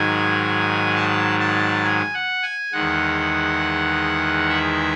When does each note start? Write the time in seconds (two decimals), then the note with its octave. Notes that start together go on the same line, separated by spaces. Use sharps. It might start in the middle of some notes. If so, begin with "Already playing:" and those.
Already playing: G#2 D#3 F#3 G#5
0.95 A5
1.40 A5
1.84 G#5
2.14 F#5
2.42 G#5
2.73 E2 D#3 G#3 F#5
4.49 E5